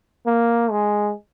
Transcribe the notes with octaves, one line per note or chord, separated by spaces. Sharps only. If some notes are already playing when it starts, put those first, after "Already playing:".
A#3
G#3